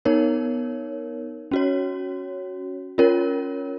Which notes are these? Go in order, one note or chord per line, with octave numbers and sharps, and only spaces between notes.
B3 D#4 A#4 C#5
C#4 F#4 C#5
C#4 F4 A#4 C#5